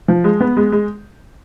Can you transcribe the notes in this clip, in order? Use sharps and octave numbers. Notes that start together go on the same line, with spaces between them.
F3
G#3
B3
G#3
G#3